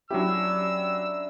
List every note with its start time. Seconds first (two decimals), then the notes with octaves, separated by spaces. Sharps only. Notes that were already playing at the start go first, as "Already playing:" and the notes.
0.10 F#3 C#4 D4 E4 G4 E6